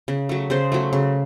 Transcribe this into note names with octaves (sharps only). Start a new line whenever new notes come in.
C#3
F#3 A3
C#3 G#4 C5
F#3 A3
C#3